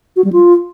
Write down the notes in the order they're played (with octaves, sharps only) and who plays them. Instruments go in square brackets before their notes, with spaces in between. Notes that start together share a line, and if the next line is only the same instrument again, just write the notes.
[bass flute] F#4
G3
F4